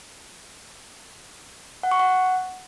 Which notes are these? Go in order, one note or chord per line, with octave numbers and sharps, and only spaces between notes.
F#5
C#6
F#5